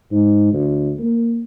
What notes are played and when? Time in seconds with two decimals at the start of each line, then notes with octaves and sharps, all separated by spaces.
0.11 G#2
0.53 D2
0.99 A#3